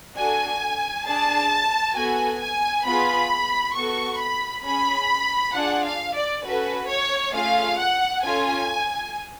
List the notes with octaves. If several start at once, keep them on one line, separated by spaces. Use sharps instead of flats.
D4 F#4 A4 G#5
D4 G#4 A5
B3 F#4 A4 G#5
G#5
B3 F4 G#4 B5
B3 F#4 A4 C#6
B5
C#4 G#4 B5
D4 F4 G#4 F#5
F5
D5
C#4 F#4 A4 B4
C#5
A3 C#4 F4 G#4 F5
F#5
C#4 F4 A4 G#5